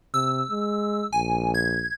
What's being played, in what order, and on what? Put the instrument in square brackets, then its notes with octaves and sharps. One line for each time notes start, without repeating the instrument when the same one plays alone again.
[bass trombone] C3 [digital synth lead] E6
[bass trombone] G#3
[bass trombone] A#1 [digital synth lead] G#5
[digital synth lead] G#6